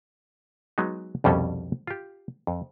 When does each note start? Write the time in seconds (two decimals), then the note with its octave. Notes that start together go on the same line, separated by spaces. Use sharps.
0.78 F#3 G#3 B3 D#4
1.24 C2 F2 B2 G3 C#4 A4
1.87 F4 G4
2.47 F2